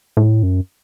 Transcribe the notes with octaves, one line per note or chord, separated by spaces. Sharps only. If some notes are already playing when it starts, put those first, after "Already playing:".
A2
F#2